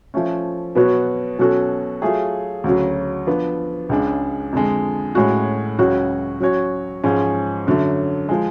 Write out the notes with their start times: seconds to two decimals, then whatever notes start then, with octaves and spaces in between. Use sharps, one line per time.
0.14 F3 A3 C#4
0.75 B2 F#3 B3 F#4 C#5
1.39 B2 F#3 C#4 F#4 A4
2.02 F#3 A3 F4 G#4
2.64 D2 C#3 F#3
3.27 F3 B3 D4
3.89 C#2 C#3 G#3 D4
4.52 F2 D3 G#3
5.15 A2 G#3 C#4 F#4
5.79 C#2 C#3 F#3 C#4 F#4
6.40 F#3 C#4 F#4 C#5
7.04 G#2 F3 G#3 C#4
7.67 F#2 D3 F#3 A3
8.29 F3 G#3